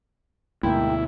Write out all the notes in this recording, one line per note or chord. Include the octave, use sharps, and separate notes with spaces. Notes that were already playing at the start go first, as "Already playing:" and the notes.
D2 G#2 B2 A#3 E4 G5